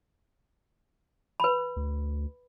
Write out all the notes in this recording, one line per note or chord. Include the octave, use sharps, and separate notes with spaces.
B4 B5
D2